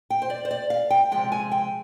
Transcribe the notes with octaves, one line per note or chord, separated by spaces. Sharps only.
G5
C5
D5
C5
D5
F5
G5
C3 F3 G#3 G5
G#5
G5